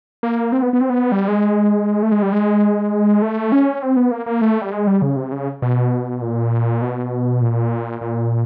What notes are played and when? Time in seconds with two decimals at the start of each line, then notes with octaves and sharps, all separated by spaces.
0.23 A#3
0.52 C4
0.62 B3
0.73 B3
0.81 C4
0.90 B3
1.12 G3
1.28 G#3
2.03 A3
2.12 G#3
2.22 G3
2.33 G#3
3.22 A3
3.52 C#4
3.83 C4
3.97 B3
4.11 A#3
4.26 A#3
4.41 A3
4.62 G3
4.72 G#3
4.87 G3
5.02 C#3
5.16 C3
5.32 C#3
5.62 B2
6.22 A#2
6.82 B2
7.41 A#2
8.01 A#2